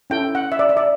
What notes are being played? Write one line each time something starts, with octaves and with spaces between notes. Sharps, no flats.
C#4 E4 A4 G5
F#5
E5
D5
E5
D5